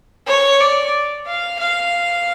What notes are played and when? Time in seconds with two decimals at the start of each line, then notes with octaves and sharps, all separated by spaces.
0.27 C#5
0.60 D5
1.27 F5
1.60 F5